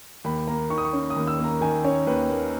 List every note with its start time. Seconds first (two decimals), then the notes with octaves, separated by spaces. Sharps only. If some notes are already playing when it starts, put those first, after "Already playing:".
0.24 D#2 B5
0.47 A#3 A#5
0.70 D#3 C#6
0.78 D#6
0.85 C#6
0.93 C#4
1.10 D#6
1.16 D#2
1.27 E6
1.39 A#3
1.44 A#5
1.61 D#3 G#5
1.84 C#4 C#5
2.07 D#2 B4
2.30 A#3